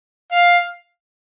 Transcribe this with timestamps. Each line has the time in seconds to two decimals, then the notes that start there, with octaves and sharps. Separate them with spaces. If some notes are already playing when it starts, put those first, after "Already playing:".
0.32 F5